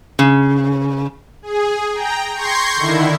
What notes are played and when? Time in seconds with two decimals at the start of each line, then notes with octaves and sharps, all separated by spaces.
0.19 C#3
1.42 G#4
1.93 G5 A#5
2.34 C6 C#6 G6 G#6 A#6 C7
2.76 D3 D#3 E4